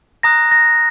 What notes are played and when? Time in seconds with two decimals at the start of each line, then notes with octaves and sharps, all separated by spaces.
0.23 A#5 D#6 F#6 A#6
0.51 A#6